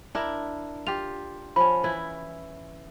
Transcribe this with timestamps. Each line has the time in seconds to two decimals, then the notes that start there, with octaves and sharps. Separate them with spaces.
0.15 D4 E4 A#4
0.87 F4 G4 F7
1.56 F3 C#4 B5
1.83 E3 E4